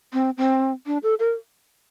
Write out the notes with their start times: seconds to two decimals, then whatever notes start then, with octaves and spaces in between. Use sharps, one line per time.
0.13 C4
0.38 C4
0.87 D4
1.03 A4
1.19 A#4